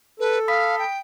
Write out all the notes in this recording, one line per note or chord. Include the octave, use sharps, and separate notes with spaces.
A4 B4
F5 B5 D#6 B6
G5